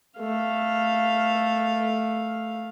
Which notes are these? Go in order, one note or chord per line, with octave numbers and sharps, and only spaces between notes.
A3 F5